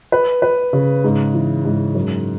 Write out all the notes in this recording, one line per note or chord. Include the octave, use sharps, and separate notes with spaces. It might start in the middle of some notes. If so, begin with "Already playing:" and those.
B4
B4
C#3
G#2
E3
G#2
F#2